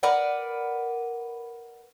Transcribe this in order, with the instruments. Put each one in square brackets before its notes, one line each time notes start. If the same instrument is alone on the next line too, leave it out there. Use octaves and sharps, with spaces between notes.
[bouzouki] A#4 B4 D5 F#5